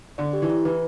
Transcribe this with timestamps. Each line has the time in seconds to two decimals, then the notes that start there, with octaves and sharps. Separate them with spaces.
0.18 D3 D5
0.33 G4
0.42 E3
0.50 E4
0.65 E3 B4